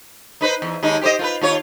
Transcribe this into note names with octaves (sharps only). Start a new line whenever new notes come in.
D#4 B4 C5
E2
D#2 G#3 D#4
G4 C5 D#5
F4 A4 B4
D#2 F4 C#5